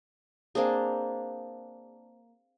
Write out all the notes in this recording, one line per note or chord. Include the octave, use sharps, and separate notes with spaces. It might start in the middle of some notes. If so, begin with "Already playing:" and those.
A#3 C4 D4 G#4